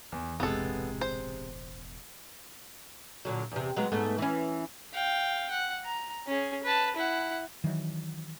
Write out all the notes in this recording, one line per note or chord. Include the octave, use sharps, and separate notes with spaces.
E2 D#3 E3
E1 A1 C3 G#3 B3 A4
C5
A#2 D3 F#3
E2 C3
F#3 G#3 B3
G#2 A3 B3
E3 C#4
F5 G5
F#5
A#5
C#4 G#4
B4 A5
E4 F#5
D#3 E3 F#3